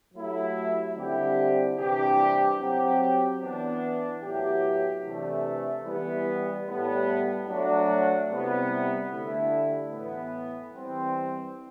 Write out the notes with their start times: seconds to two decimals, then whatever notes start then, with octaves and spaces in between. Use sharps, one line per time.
0.14 F#3 A3 E4 G4
0.96 D3 G3 C4 E4 G4
1.77 C3 E3 G3 D4 G4
2.59 F#3 C4 G4
3.41 E3 B3 D4
4.22 A2 F#3 B3 E4 G4
5.03 C3 E3 A3 D4
5.85 E3 G3 B3
6.66 A2 G3 B3
7.48 F#3 A3 D4 F#4
8.29 C3 G3 B3 E4
9.11 D3 A3 E4 G4
9.92 A2 E3 B3
10.74 E3 G3 C4